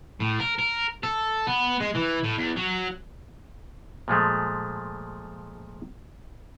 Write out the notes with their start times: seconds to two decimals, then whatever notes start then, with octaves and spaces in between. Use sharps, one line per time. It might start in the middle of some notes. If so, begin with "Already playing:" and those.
0.20 A2
0.40 A#4
0.59 A#4
1.03 A4
1.47 B3
1.80 G#3
1.95 E3
2.23 A2
2.37 E2
2.56 F#3
4.08 A#2 F3 G#3 A3